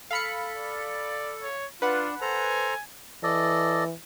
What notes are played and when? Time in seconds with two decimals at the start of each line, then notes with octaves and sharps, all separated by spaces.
0.11 A4 F5 B5 C#7
0.57 D5
1.41 C#5
1.82 D4 F4 B4 F#5
2.21 A4 C5 G#5 A#5
3.23 E3 A4 D5 D#5